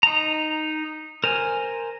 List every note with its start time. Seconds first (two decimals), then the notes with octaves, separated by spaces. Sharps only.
0.03 D#4 A#5
1.24 A#4 C5 G#5